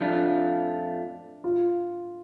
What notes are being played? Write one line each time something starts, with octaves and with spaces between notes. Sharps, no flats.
F2 F3 A3 D4 F4
F4